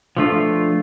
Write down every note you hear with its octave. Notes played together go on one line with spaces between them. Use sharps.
B2 F3 A3 D4 F4 G4